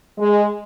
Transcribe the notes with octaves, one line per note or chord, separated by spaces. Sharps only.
G#3